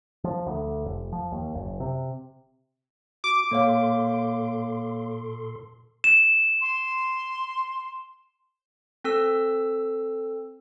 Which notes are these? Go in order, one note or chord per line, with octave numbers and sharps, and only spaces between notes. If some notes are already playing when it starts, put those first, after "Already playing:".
F3
D2
F1
F3
D#2
F#1
C3
F#4 D6
A#2 A#3 A4 C#5 F5 C6
E7
C6
C4 A4 E6